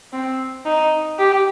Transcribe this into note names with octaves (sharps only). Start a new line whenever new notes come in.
C4
D#4
G4